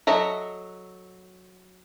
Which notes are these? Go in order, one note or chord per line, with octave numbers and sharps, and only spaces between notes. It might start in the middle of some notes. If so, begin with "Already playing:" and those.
F#3 A4 D#5 E5